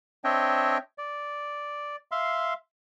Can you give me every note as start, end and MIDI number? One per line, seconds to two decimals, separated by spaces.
0.24 0.78 60
0.24 0.78 62
0.24 0.78 73
0.24 0.78 75
0.24 0.78 76
0.24 0.78 79
0.98 1.96 74
2.12 2.54 76
2.12 2.54 77
2.12 2.54 84